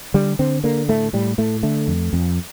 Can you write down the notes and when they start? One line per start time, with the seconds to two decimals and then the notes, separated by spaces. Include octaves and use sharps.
0.14 D3 G3
0.39 D3 C4
0.64 D3 A#3
0.89 A2 A3
1.13 A2 G3
1.38 A2 A3
1.63 D3 A3
1.88 F2
2.13 F2